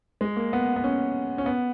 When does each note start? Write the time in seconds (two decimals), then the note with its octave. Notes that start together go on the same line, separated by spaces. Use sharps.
0.21 G#3
0.36 A#3
0.53 B3
0.76 B3
0.84 C#4
1.38 C#4
1.46 B3